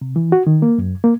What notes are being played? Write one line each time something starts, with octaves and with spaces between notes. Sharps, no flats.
C3
E3
F#4
D#3
A#3
F#2
A#3